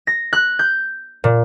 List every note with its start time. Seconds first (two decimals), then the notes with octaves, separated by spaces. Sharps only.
0.07 A#6
0.33 F#6
0.59 G6
1.24 A#2